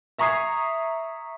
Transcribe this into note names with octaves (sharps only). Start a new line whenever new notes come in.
E5 A#5 C#6 D#6 G#6 C7